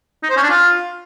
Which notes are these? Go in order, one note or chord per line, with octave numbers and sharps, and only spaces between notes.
D#4
C5
C#4
D4
F4